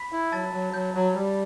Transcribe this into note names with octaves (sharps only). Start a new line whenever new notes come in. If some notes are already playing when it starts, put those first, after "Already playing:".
Already playing: B5 B6
E4
F#3 A5 A6
F#3
F#3 G6
F#3
G3